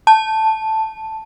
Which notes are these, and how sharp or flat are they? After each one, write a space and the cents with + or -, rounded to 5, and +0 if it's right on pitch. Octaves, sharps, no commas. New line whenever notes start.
A5 +0